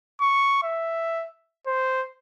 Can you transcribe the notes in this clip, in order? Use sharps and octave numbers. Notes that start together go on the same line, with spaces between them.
C#6
E5
C5